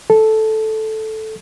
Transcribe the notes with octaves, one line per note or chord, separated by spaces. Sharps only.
A4